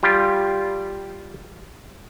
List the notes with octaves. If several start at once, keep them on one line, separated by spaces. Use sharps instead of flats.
G3 F4 G4